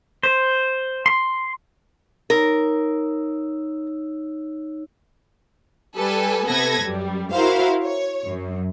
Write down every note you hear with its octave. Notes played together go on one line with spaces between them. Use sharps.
C5
C6
D#4 A#4 C#5 E6
G3 A4 B4 G#5
C3 B3 A4 B4 G#6 A#6
F#2 G3
E4 F#4 A#4 C5 F5
C#5
F#2